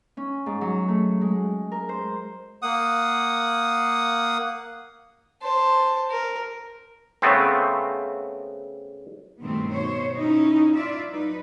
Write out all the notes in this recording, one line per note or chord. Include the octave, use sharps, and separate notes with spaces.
C#4
G#2
F#3
A3
G#3
A#4
C5
A#3 F#5 D#6
C5 A5
A#4
C#3 A3 B3 C4
G2 B2 D#3 A3 B3 C4
B2 C5 C#5
C#4 D#4 E4
E4 F4 D5 E5
F#3 D#4 B4